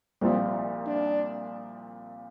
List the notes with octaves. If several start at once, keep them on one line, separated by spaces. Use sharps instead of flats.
C2 A#2 F3 C4
D4